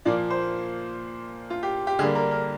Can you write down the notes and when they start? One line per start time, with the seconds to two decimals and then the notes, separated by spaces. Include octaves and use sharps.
0.05 A#2 F3 A#3 D5
0.30 C5
1.50 F4
1.63 G4
1.87 G4
1.99 D3 G#4
2.02 G3 A#3
2.15 A#4
2.31 A#4